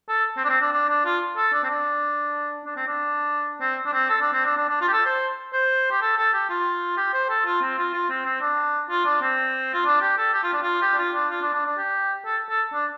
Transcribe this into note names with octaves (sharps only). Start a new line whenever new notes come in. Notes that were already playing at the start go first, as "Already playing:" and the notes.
A4
C4
D4
C4
D4
D4
D4
F4
A4
D4
C4
D4
D4
C4
D4
C4
D4
C4
A4
D4
C4
D4
D4
D4
F4
G4
A4
C5
C5
G4
A4
A4
G4
F4
G4
C5
A4
F4
C4
F4
F4
C4
C4
D4
F4
D4
C4
F4
D4
G4
A4
G4
F4
D4
F4
G4
D4
F4
D4
F4
D4
D4
D4
G4
A4
A4
D4